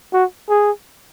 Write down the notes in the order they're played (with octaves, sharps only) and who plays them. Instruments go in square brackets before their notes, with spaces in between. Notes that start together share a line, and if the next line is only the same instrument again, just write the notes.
[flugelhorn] F#4
G#4